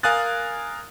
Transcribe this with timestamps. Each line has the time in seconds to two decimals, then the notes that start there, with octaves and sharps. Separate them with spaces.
0.03 A#4 F5 G#5 D#6 F#6 A6